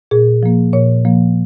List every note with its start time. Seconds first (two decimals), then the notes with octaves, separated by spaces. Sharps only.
0.11 A#2 G#4
0.43 F3 A#3
0.73 A#2 C#5
1.05 F3 A#3